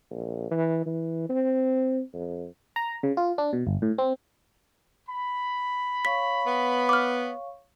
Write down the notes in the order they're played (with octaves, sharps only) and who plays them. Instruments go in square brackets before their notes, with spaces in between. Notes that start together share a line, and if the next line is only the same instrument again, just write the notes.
[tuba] A#1
E3
E3
C4
F2
[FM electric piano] A#5
C#3
F4
D4
B2
G1
A2
C4
[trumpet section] B5
[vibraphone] C#5 F5 C#6 [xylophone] B6
[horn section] B3
[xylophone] D6 F6